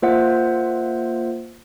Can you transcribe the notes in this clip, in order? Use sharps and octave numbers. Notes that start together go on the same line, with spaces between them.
A#3 F4 C5 E5 F#5